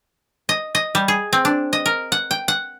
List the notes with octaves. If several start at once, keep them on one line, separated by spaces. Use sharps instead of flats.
D#5
D#5
G3
G#4
C4
D4
D#5
A#4
F#5
G5
F#5